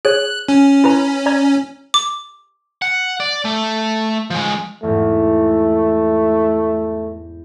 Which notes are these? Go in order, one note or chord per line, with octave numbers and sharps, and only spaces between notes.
G#4 C#5 F#6
C#4
E4 B4 A#5
D5 A#5 G#6
D6
F#5
D5
A3
F3 G#3
E2 G#2 A3